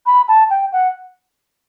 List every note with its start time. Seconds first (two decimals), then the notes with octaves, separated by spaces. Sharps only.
0.06 B5
0.28 A5
0.50 G5
0.72 F#5